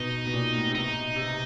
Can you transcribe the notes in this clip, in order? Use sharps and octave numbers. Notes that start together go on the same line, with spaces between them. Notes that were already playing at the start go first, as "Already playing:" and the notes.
Already playing: B2 D#4
B2
A#2
A2
C3
B2 D#4
C3